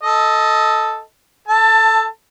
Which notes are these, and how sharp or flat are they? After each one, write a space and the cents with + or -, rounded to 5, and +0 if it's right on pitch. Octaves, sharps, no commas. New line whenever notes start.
A4 +0 D#5 +15
A4 +0 A5 +20